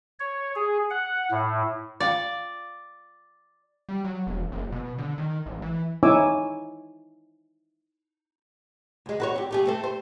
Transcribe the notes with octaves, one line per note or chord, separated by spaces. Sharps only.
C#5
G#4
F#5
A2
F4 D5 F5 G5
G3
F#3
E1
F#1
B2
D3
D#3
A1
E3
D#4 E4 C#5 G#5 D6 E6
D2 G#3
F#4 B4 C#5
C4 G4
A3 G4 G#4
A3 C4 A4
C5